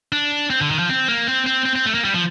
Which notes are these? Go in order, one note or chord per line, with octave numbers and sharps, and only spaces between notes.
D4
C4
D3
D#3
F3
C4
A#3
C4
C4
C4
C4
A3
A#3
G3
F3